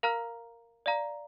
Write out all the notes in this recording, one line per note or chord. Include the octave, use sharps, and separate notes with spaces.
A#4 F5 A#5 F6
D5 F5 A#5